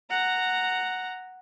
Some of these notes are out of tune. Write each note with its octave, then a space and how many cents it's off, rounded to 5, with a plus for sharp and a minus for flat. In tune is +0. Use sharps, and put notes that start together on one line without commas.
F#5 +0 A#5 -10